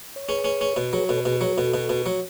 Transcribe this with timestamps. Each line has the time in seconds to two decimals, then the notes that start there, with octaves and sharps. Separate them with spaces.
0.16 C#5
0.29 C#4 G#4 B4
0.44 C#4
0.61 C#4
0.76 B2
0.93 F#3 G#4 B4
1.09 B2 A4 C#5
1.25 B2 G#4 B4
1.41 F#3 G#4 B4
1.57 B2 F#4 A4
1.74 B2
1.89 B2
2.06 F#3